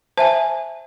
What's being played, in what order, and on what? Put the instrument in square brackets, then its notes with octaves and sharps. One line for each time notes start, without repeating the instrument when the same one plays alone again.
[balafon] C5 E5 G#5 [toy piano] A5